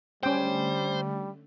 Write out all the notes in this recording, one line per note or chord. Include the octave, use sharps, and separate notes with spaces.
D3 G3 A3 C#4 C5 G5